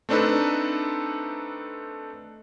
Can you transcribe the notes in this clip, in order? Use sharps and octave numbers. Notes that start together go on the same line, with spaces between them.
A3 C4 D4 D#4 A4 B4